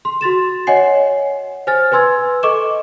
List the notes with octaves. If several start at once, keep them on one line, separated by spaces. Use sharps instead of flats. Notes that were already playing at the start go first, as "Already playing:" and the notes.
C6
F#4 C6 A6 E7
C#5 D#5 F#5 G#5 C7
C5 G#5 F6 A6
B4 G#5 C6 E6 G#6
A4 D#5 C#6 D6 E7